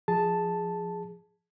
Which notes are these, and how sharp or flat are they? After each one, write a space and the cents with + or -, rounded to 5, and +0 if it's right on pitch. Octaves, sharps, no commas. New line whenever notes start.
F3 +0 G#4 +0 A5 +0